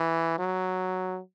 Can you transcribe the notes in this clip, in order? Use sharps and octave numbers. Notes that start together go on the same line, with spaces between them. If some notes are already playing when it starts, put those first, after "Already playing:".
Already playing: E3
F#3